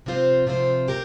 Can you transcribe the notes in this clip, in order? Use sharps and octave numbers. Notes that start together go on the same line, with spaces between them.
C3 F3 C4 F4 C5
C3 F3 C4 F4 C5
A#3 G4 A#4